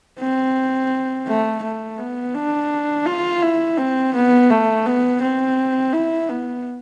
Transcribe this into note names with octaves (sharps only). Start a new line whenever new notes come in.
C4
A3
A3
B3
D4
F4
E4
C4
B3
A3
B3
C4
E4
B3